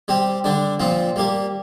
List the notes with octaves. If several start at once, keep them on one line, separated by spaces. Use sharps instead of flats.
G3 C4 G4
D3 G3 D4
A#2 F3 C4 F4
G3 A#3 G4